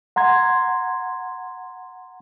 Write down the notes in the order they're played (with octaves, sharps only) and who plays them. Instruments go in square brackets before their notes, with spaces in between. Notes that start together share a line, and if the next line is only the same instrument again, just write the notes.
[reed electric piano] F#5 A#5 C6 G#6